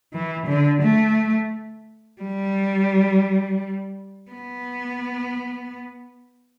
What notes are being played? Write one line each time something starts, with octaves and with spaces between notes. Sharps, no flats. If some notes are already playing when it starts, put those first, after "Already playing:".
E3
D3
A3
G3
B3